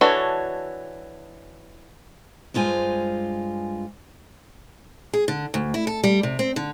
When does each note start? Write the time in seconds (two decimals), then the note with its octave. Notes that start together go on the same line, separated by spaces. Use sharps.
0.01 E3 D4 F#4 A4 C#5
2.54 G2 G#3 F4 C5 G#5
5.14 G#4
5.28 D3
5.54 D2
5.74 E4
5.87 A4
6.04 G3
6.23 C3
6.39 C4
6.56 D3